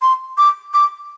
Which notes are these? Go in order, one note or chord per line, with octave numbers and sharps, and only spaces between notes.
C6
D6
D6